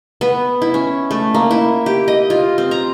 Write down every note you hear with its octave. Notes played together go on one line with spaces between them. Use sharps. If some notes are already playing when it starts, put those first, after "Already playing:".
B3
E4
C#4
A3
A#3
E4
G4
D#5
F4
C4
A#5